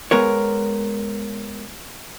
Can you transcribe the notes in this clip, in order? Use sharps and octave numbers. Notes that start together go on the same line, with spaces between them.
G#3 B3 A#4 C#5